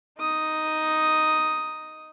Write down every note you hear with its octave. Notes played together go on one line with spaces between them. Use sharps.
D#4 D#6